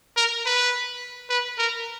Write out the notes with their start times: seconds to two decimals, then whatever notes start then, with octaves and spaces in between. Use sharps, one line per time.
0.17 A#4
0.45 B4
1.30 B4
1.58 A#4